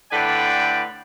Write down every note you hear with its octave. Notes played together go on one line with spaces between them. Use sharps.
A2 D3 B4 D5 G5